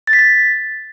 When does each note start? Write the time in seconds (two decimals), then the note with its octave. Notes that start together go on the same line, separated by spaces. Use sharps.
0.07 A6
0.13 B6
0.19 A6